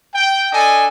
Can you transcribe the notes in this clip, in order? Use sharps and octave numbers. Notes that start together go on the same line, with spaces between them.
G5
D4 A4 D#5 G#5